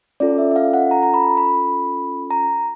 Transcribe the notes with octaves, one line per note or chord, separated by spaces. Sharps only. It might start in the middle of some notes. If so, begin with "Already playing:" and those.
C#4 F4 A4 D5
E5
E5
F5
F#5
A#5
A#5
B5
B5
A#5